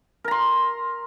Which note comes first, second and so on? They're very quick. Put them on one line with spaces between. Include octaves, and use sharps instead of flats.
A#4 A#5 C6